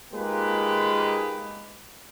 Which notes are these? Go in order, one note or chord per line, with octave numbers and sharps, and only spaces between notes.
G#3 A#3 D#4 F4 G4 B4